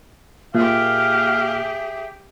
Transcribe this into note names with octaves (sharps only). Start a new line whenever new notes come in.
A#2 G4 G#4 E5 F5